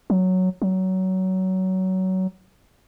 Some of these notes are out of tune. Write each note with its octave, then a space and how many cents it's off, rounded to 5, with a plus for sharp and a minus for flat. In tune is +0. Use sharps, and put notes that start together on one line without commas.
F#3 +0
F#3 +20